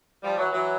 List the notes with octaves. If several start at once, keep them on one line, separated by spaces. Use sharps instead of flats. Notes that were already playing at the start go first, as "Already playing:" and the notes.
F3 G3
E3 F#3
E3 F#3